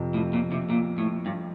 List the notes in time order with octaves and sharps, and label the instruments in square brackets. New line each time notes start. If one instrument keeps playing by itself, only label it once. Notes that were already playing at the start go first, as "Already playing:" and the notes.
Already playing: [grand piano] F2 C3 F3
[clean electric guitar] A2
A#2
C3
A#2
A2
G2